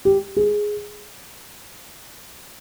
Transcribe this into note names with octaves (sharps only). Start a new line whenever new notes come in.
G4
G#4